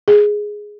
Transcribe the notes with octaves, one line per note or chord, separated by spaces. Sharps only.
G#4